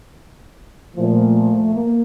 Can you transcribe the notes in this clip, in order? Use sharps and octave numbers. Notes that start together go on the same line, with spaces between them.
A#2 F3 A3
A#3